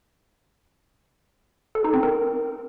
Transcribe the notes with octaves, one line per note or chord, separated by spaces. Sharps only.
A4
D#4
C4
A#4